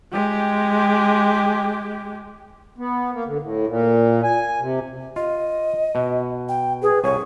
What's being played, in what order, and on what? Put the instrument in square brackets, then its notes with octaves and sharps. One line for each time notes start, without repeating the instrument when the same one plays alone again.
[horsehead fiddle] G#3 G4
[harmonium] B3
A#3
D3
A2
A#2
G#5
C3
[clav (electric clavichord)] F4 [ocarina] D#5
[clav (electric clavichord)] B2
[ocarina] G5
[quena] G#4 [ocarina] B4
[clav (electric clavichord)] C2 G#5 [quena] C#5 [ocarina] C#6